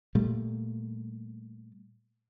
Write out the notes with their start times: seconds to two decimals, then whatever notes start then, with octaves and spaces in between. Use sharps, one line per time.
0.15 A#2 G3 A3